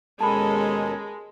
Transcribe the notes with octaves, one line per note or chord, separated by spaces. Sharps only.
D#2 B2 G#3 C#4 A4 A#4 A5 B5